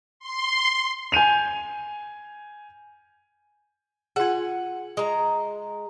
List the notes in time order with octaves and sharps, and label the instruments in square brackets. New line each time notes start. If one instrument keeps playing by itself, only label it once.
[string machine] C6
[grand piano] G#5 G6 D#7 F7
[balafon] F4 G#4 [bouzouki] F#5 G#5
[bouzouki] G#3 A#5